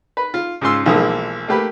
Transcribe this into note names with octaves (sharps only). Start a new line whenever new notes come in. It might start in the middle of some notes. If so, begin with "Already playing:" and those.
B4
F4
G#2 C#3 F4 G#4 C6 E6
B1 E3 F3 G#3 A#3 D#6
A3 A#3 G4 B4